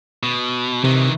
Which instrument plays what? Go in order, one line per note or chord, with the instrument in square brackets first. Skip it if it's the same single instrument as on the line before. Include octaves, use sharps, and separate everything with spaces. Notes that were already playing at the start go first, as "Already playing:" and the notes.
[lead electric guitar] B2
[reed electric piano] C3 [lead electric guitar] D#3 E3